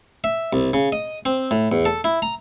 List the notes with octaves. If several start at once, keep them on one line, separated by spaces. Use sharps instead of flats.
E5
C2
C#3
D#5
C4
A2
E2
A4
E4
A#5